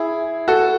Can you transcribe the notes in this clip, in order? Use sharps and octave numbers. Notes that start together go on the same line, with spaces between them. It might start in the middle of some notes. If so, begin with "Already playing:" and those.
Already playing: E4 G#4
F#4 A4